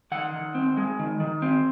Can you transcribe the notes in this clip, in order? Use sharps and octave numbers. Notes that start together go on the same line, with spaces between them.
D#3 F#5
D#3
C4
G#3
D#3
D#3
C4